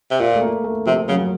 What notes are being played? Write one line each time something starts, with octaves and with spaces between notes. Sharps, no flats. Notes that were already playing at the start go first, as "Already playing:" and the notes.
C3
A#2 F4
A3
A#3
A3
C3 F3
C#3 F#3